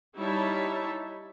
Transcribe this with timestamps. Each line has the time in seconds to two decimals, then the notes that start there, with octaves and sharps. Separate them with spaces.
0.17 G3 D#4 E4 C#5 E5 A5